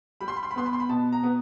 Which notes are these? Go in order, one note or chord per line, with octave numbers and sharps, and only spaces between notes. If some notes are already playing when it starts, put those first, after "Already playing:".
G3 B5
C6
B5
C6
B5
B3 C6
B5
C6
B5
B2 A5
A#5
B3